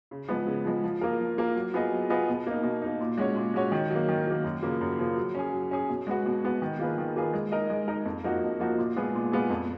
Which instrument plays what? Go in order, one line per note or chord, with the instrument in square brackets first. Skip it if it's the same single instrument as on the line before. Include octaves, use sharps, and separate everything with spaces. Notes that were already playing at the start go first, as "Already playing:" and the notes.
[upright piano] C#3
F3 G#3 B3
C#3
F3 G#3 B3
F3
A#3 F4 A#4
F3
A#3 F4 A#4
F#3
B3 F4 G#4 D#5
F#3
B3 F4 G#4 D#5
B2
A#3 D#4
B2
A#3 D#4
A#2
G#3 C#4 F#4 C#5
A#2
G#3 C#4 F#4 C#5
D#3
F#3 A#3
D#3
F#3 A#3
F#2
C#3 F3 A#3
F#2
C#3 F3 A#3
F#3
C#4 G#4
F#3
C#4 G#4
B2
G#3 B3 F#4
B2
G#3 B3 F#4
D#3
A#3 F4 G#4 B4
D#3
A#3 F4 G#4 B4
G#3
D#4 A#4 D#5
G#3
D#4 A#4 D#5
F2
F3 A#3 D#4 F#4
F2
F3 A#3 D#4 F#4
A#2
G#3 B3 F4 G#4
A#2
G#3 B3 F4 G#4
F2